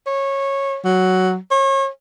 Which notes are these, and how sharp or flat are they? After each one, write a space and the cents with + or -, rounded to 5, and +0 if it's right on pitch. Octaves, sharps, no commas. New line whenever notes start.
C#5 -15
F#3 +5
C#5 -35